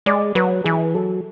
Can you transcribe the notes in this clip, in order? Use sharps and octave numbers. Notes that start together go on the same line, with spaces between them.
G#3 D5
F#3 B4
E3 G#4
F#3 A4